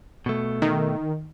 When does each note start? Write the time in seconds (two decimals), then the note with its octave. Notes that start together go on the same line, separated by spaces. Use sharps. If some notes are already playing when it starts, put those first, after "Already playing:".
0.26 B2 A3
0.62 D#3